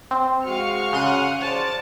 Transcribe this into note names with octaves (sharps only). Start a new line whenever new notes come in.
C4
G#3 F#4 F5 C#6 F6 C#7
C#3 F#5 C6 D#7
C5 D5 A5